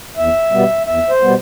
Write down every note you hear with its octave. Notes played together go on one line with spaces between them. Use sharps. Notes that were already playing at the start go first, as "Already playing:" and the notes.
E2 E5
B2 G3 B3
E2 E5
C5
B2 G3 B3